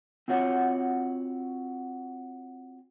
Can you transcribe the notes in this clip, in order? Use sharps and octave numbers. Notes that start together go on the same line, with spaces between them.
C4 F4 F#4 C#5 F#5